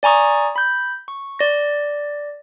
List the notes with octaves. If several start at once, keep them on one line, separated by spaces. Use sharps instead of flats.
D5 G#5 A#5 C#6 D#6
B5 G6
C#6
D5 A#6